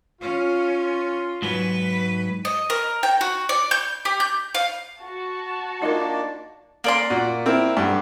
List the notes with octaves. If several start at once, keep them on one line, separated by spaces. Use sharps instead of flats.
C#4 F4
G#2 F#3 B4
D#5
A#4
G5
F#4
D5
G6
G4
G6
F5
F#4 A5
A#3 D4 D#4 F4 A#4 D5 D#5
A#3 D5 C6
A#2 F#4
C4 E4 A#4
B1 G2